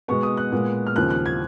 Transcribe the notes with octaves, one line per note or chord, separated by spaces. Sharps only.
B2 G#3 B3 C#6
D#6
F#6
A#2 G#3 B3
F6
D#2 C#3 F3 F#6
F#6
G#6